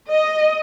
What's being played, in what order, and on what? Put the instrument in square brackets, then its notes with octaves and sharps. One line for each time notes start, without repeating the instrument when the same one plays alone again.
[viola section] D#5